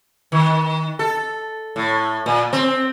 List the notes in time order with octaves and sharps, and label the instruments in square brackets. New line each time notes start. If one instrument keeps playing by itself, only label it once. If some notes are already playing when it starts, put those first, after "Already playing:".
[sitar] D#3
A4
A2
A#2
C4